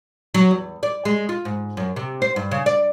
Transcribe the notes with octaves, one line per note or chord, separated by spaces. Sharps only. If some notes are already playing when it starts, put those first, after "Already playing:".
F#3
E2
D5
G#3
F4
G#2
F#2
C3
C5
G2
C#3
D5